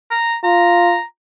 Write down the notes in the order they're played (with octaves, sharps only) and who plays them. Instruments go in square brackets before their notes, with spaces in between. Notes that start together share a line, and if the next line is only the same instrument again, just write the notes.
[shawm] A#5
[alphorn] F4 [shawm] A#5